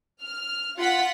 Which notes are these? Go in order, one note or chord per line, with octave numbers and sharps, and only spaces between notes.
F6
F4 F#5 B6